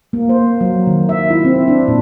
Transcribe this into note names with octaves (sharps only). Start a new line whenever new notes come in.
A#3
C5
F#3
D#3
E5
E4
C4
D4
A#2